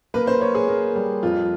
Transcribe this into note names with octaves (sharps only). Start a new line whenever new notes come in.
A#3 B4
C5
A#3 C#5
G#4
A#3
G3
F2 F4